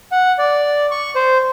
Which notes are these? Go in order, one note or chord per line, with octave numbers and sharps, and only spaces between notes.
F#5
D5
C#6
C5